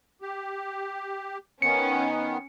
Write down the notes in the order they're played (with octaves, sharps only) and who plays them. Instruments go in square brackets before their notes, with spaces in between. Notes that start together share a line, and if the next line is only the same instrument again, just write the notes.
[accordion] G4
[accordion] D#3 B3 [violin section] C#4 [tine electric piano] C#7